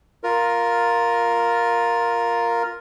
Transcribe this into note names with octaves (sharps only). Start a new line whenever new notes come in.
F4 A#4